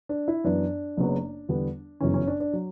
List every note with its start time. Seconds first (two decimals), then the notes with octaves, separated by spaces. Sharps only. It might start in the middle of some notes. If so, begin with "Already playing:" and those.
0.09 D4
0.28 E4
0.44 F#2 E3 B3 D4
0.97 F#1 F#2 C#3 F#3 B3
1.49 E2 D3 G3 B3
2.00 G1 F#2 C#3 E3 C#4
2.14 C#4
2.27 D4
2.40 D4
2.53 F#3